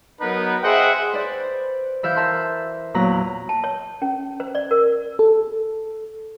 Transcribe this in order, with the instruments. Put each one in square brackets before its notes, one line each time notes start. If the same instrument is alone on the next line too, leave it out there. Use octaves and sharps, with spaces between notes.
[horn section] F#3 B3 D#4 A#4 B4
G#4 C5 D#5 E5 F#5 G5
[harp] B4 C5 D5
E3 E5 F5 G6
A#4 E5 A5 C6
E2 A#2 F#3 B4 A#5 F#6
[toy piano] A5
C#5
C#4
C5
D5
A#4
[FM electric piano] A4